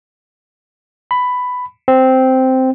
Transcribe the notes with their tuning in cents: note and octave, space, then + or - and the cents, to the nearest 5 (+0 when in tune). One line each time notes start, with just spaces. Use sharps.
B5 +10
C4 -5